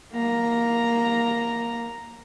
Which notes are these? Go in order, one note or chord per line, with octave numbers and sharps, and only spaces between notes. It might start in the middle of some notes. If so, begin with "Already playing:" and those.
A#3 A#5